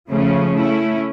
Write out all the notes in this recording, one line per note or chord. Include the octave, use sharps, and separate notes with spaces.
C#3 F3 A3 C#4
A3 C#4 E4